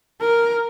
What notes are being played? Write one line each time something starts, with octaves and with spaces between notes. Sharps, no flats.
A#4